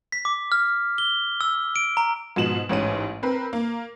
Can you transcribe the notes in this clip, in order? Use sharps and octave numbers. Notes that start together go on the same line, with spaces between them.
B6
D6
F6
G7
E6
D7
A#5
G#2 B2 F3 E7 F#7
A1 G#2 C#4 D#7
C4 A#4 B4
A#3